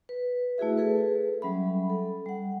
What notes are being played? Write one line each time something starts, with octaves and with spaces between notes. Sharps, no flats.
B4
A3 E4 F#4 G#4 E5
G#4 A4 B4
F#3 G3 C#4 E5 B5
A4
G3 F#5